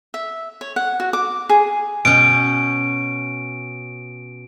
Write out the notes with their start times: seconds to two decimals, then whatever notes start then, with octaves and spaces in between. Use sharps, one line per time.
0.14 E5
0.61 C#5
0.76 F#5
1.00 F#4
1.13 D6
1.49 G#4
2.05 B2 C#4 G5 D7